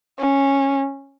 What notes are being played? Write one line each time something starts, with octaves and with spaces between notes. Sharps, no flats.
C#4